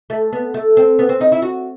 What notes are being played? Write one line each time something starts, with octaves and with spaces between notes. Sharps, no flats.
A3
B3
A3
C4
B3
C4
D#4
E4
F#4